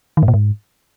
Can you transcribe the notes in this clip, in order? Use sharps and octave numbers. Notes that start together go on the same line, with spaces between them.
D#3
G#2
A#2
G#2